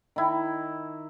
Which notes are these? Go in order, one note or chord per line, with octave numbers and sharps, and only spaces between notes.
D#3 E4